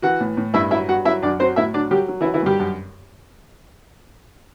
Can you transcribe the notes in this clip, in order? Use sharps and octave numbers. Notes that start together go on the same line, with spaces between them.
E3 F#4 F#5
A2
A2
G2 E4 E5
F#3 E4 E5
G2 F#4 F#5
F#3 E4 E5
F#2 D4 D5
F#3 C4 C5
A2 E4 E5
F#3 D4 D5
F#3 G3 G4
F#3
E3 E4
F#3
E3 E4
G2 G3 G4
F#2